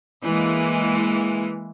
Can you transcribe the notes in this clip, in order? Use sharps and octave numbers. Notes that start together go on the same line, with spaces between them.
E3 G#3 A#3